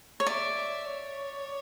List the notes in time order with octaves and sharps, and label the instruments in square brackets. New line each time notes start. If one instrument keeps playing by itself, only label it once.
[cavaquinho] C#5
[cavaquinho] D5 [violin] E5
[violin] E5
C#5